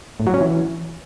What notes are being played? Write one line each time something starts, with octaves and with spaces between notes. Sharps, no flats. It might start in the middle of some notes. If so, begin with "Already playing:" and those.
A2
F#3
C#4
E3